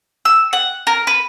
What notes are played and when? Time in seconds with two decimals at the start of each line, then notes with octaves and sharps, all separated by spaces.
0.25 E6
0.53 F#5
0.87 A#4
1.07 B4